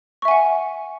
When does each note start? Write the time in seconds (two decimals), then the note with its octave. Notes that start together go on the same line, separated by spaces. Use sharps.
0.22 C#6
0.25 E5
0.28 G#5
0.31 F#5